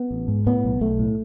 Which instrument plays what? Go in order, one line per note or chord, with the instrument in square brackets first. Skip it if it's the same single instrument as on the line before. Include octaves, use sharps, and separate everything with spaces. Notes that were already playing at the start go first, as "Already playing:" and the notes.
Already playing: [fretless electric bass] B3
A1
G#2
A2 B3
B1
B1 A3
A2